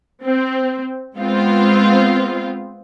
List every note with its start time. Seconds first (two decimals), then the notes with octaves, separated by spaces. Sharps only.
0.23 C4
1.18 G#3 B3 C4 F4